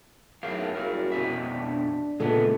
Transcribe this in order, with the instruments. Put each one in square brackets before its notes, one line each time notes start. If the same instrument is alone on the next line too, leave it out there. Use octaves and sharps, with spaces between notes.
[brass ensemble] B1 F#2 A2 [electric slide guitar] G#4 A#4 F5
[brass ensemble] F#1 C2 C#3 [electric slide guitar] F#4 A#4
[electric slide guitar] F2 B2 E5
[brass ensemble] D4
[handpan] A#2 C#3 A4 [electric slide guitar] G#3 B3